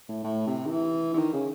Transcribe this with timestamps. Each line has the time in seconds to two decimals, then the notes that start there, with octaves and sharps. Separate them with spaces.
0.09 A2
0.24 A2
0.47 C3
0.65 D#3
0.71 E3
1.13 E3
1.18 D#3
1.33 C#3